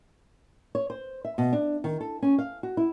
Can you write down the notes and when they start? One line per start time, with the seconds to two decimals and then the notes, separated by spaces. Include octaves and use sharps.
0.75 C#5
0.90 C5
1.24 E5
1.38 B2
1.53 D4
1.84 D#3
2.01 A4
2.22 C#4
2.39 F5
2.63 F#4
2.77 E4